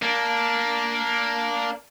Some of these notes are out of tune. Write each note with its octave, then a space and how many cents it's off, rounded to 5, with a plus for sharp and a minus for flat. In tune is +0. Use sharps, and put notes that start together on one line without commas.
A#3 +0 D4 -10